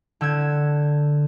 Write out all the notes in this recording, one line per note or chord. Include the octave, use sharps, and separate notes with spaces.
D3 F#5 E6 G6 G#6